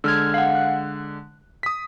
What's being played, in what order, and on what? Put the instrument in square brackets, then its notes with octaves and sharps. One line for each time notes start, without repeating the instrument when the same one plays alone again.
[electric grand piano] D3 G#3 [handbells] E6 F6 G#6
[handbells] F5 F#5
F#6
[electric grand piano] D#6 B6